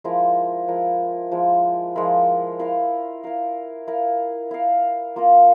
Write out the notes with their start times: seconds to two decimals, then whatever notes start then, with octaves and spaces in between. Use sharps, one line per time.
0.04 F3 G#3 E4 A#4
0.68 F3 G#3 E4 A#4
1.31 F3 G#3 E4 A#4
1.96 F3 G#3 E4 A#4
2.59 E4 A#4 F5
3.23 E4 A#4 F5
3.88 E4 A#4 F5
4.51 E4 A#4 F5
5.16 A#3 F4 A#4